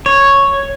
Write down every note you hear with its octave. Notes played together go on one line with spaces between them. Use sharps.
C#5